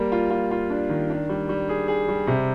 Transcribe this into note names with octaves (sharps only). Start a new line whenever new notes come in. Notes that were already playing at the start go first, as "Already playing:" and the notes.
Already playing: G3 A#3
F4
F4
F4
D4
D#3
D4
G3
G3
G#4
G#4
G3
C3